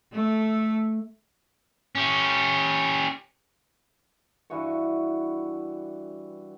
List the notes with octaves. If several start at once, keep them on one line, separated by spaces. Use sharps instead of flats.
A3
C#4 G4
G2 E3 F#4 C#6